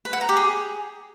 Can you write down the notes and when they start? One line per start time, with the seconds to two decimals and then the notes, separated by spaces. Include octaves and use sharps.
0.05 B4
0.13 F#5
0.21 A#5
0.29 G4
0.37 G#4